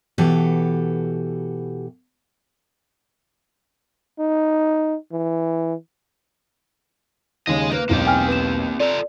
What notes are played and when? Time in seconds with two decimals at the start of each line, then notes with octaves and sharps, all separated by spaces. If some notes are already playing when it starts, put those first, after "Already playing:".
0.18 B2 E3 F#4 G4 A4
4.19 D#4
5.12 E3
7.47 D#2 C#3 G#3 D#5
7.72 A#3 B4 C5
7.89 E1 B1 A#3 C4 G4
8.07 G5 G#5 F6
8.28 B4 E7
8.80 F4 A4 D5 A#5